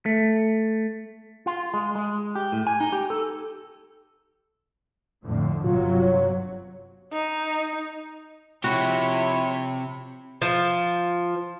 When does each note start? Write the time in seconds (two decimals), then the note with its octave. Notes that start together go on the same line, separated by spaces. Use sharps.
0.06 A3
1.46 F4
1.74 G#3
1.95 G#3
2.35 G4
2.52 A2
2.67 G#5
2.80 D#4
2.92 G4
3.10 A4
5.25 F2 A2 D3
5.64 G1 C3 F#3 F4
6.02 C#5
7.12 D#4
8.64 C3 F3 E4 F#4 G4 C#5 B5
10.42 F3